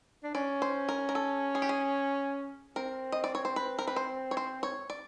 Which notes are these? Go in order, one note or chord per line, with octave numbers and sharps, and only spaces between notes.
D4
C#4 D5
C5
A#4
A#4
A4
G#4
G4
G#4
C4 A#4
D#5
D5
C#5
C5
B4
A#4
B4
C5
C#5
C5
C#5
D5